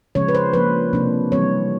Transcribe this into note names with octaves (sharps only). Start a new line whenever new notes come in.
C#3 F3 G#3 C#4 C#5
B4
C5
F3 A#3 D4 B4
C3 F3 A#3 D4
E3 G3 C4 C#5